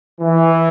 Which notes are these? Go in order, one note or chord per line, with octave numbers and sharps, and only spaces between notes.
E3